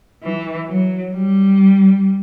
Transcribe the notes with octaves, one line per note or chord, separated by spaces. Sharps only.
E3
F#3
G3